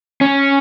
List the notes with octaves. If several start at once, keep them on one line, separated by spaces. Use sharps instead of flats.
C#4